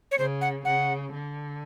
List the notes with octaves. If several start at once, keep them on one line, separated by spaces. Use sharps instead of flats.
C#5
C#3 C5
F#5
C#3 F#5
D3